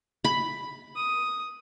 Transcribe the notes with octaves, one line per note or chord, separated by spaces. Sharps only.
B5
D#6